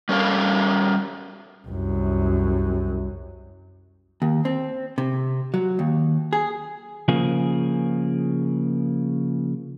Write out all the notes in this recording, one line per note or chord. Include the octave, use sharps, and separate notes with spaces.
G3 C#4 A4 A#4 F5
C2 F#2
D#2
C4
C3
F#3
D#2
G#4
C#3 F3 A#3 G#4